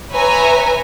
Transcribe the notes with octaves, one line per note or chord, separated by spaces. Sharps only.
B4 C#5 E5 G#5 A#5